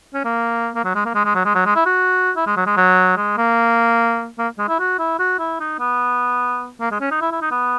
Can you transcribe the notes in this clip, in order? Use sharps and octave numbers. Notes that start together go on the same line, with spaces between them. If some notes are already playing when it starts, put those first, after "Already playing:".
C#4
A#3
A#3
F#3
G#3
A#3
G#3
G#3
F#3
G#3
F#3
G#3
E4
F#4
E4
G#3
F#3
G#3
F#3
G#3
A#3
A#3
G#3
E4
F#4
E4
F#4
E4
D#4
B3
A#3
G#3
C#4
D#4
E4
E4
D#4
B3